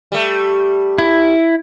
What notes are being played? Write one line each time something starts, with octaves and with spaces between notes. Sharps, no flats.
G3 A3
E4